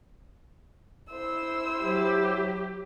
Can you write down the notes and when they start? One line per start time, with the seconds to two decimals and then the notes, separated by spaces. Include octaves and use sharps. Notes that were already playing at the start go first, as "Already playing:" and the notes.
1.11 E4 C5 E6
1.81 F#3 G4